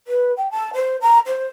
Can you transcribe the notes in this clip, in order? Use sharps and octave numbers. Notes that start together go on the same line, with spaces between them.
B4
G5
A5
C5
A#5
C5